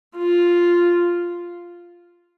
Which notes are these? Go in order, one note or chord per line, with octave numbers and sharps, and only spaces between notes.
F4